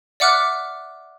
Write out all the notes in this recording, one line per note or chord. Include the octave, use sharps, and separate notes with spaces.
D5 E5 F#5 D6 F6 F#6